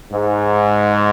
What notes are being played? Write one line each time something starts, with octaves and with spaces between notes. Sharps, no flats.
G#2